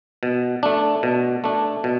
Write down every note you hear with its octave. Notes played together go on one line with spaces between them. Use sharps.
B2
A3 D4
B2
A3 D4
B2